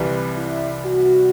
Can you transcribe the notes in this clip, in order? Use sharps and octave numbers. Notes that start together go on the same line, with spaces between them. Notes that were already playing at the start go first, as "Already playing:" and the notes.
Already playing: C2 C3 E3 G3
E4
F#4